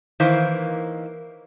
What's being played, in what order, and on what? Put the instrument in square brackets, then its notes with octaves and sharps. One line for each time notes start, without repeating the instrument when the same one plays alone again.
[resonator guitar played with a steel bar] D#3 E3 A#3 C5